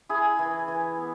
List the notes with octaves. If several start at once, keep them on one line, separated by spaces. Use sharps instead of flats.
E4 G#4
E3
E3
B3